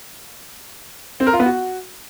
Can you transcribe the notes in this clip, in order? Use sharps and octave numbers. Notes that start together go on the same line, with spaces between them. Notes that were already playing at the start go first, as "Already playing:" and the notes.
C4
A#4
F4
B3
F#4